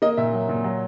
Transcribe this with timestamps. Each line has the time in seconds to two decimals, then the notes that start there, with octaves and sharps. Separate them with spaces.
0.02 A#3 D#5
0.17 A#2 E5
0.33 F#3
0.49 A#2
0.64 F#3